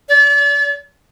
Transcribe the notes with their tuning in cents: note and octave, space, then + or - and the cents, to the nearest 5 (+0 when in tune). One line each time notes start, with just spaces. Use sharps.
D5 -40